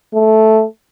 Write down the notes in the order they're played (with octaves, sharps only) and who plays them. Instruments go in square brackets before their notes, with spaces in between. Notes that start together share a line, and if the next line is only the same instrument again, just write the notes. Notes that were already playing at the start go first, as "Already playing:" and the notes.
[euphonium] A3